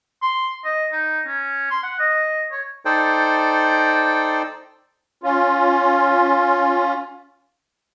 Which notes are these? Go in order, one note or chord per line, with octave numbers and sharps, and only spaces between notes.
C6
D#5
D#4
C#4
C6
F#5
D#5
C#5
D#4 A4 C5 D5 G5
C#4 F4